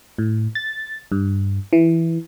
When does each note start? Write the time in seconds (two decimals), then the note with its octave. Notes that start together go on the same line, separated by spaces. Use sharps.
0.18 A2
0.55 A6
1.12 G2
1.73 E3